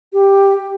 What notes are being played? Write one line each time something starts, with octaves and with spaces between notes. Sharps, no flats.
G4